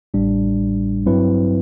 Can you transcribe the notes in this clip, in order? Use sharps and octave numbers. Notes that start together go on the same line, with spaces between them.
A1 A2 G3 D4
G2 F#3 C4 E4 B4